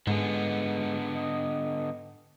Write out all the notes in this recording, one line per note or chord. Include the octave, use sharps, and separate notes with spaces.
G#2 D3 G#3 B3
D#5